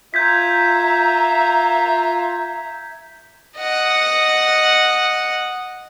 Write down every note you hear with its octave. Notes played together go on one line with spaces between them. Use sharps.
F4 E5 A#5 G6 G#6 B6
D#5 F#5